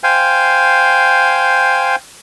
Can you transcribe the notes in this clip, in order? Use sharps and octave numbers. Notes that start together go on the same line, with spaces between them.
C5 F5 G5 G#5